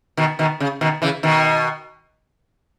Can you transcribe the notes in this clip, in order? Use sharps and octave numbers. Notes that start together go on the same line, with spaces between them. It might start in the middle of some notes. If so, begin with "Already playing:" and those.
B2 D#3
B2 D#3
C#3
B2 D#3
C#3 E3
B2 D#3